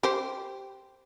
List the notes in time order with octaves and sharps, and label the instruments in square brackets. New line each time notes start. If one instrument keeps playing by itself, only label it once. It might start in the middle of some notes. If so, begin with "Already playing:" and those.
[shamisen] G4 C5